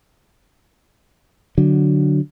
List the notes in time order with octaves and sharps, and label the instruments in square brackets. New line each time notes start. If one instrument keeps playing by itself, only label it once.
[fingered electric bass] D3 F#3